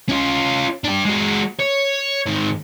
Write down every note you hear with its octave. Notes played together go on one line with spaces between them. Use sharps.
C#4 F4
D4 G4
G#3 F#4
C#5
G#2 D#3